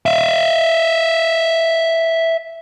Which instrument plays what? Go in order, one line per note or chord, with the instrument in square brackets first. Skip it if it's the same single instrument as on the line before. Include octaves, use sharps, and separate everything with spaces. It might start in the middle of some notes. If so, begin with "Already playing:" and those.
[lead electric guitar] E5 F5